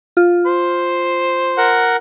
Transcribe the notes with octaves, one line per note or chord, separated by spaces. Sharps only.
F4
C5
A#4 F#5